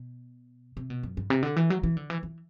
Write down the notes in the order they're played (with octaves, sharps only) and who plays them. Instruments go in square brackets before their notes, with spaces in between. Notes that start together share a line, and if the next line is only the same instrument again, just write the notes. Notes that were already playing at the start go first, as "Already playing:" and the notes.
Already playing: [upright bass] B2
C3
B2
F#2
G2
C3
D3
E3
F#3
E3
D3
E3
E3